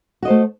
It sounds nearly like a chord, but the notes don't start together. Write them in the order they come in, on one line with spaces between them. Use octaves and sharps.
F#4 D#5 C5 A3